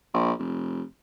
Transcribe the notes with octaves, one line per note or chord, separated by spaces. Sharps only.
A#1
F1